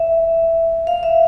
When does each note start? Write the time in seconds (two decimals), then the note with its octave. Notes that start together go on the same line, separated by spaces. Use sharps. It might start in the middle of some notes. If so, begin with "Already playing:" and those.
Already playing: E5
0.87 F5
1.03 E5